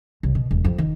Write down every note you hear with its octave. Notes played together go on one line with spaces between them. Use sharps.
C2
B2
E1
F2
D#3